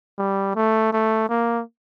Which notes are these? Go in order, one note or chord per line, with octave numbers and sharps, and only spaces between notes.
G3
A3
A3
A#3